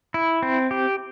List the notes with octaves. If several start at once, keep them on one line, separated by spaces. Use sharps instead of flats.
E4
C4
G4